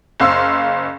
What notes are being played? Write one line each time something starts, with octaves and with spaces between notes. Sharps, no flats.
F#1 C5 F5 C6 E6